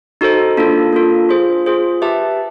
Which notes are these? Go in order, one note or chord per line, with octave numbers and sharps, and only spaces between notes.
D#4 F#4 A4 C5
A#3 D4 F4 A4
A#3 D4 F4 A4
F4 G#4 C5
F4 G#4 C5
G4 B4 E5 A5